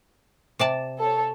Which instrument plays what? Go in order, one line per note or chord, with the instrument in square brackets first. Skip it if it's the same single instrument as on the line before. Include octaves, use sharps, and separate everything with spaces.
[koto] C3 D5 A5
[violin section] A4 C#5